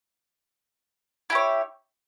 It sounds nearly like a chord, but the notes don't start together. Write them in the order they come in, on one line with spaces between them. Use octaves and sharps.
E4 G4 C#5